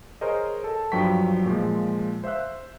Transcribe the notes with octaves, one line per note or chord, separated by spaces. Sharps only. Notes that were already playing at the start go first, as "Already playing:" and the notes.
G#4 A#4 C5 C#5 D#5
A4 A5
G2 F3 F#3 G5 C#6 B6
A#2 F3 G#3
C5 E5 F5 E6 F#6